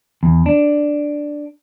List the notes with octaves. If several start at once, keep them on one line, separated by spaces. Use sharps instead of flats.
E2
D4